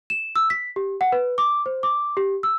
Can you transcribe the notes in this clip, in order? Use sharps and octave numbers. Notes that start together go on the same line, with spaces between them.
E7
E6
B6
G4
F#5
B4
D6
C5
D6
G4
E6